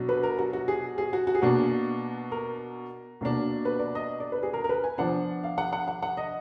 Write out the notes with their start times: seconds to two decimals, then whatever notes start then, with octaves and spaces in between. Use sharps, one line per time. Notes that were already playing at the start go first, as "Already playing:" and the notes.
Already playing: B2 F#3 D4
0.09 B4
0.23 A#4
0.39 F#4
0.53 F#4
0.68 G#4
0.98 G#4
1.13 F#4
1.27 F#4
1.35 G#4
1.42 B2 A#3 D4 F#4
2.32 A#4
3.21 B2 A#3 D4
3.65 B4
3.79 D5
3.95 D#5
4.20 D5
4.32 B4
4.43 G#4
4.54 A#4
4.64 A#4
4.69 B4
4.84 G#5
4.98 F3 B3 D4 F#5
5.43 F5
5.58 F#5
5.73 F#5
5.88 F#5
6.02 F#5
6.17 D#5